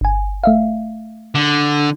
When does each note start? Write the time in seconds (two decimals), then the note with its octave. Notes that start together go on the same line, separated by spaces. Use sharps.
0.01 G1 G#5
0.44 A3 E5 F5
1.35 D3